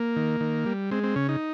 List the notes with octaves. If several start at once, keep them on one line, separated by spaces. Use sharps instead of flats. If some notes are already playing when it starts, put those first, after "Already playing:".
Already playing: A#3
D#3
D#3
G3
G#3 C4
C4
C#3 C#4
D#4